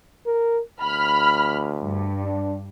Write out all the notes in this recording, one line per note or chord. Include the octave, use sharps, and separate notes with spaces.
A#4
D2 B5 F6
G2
D4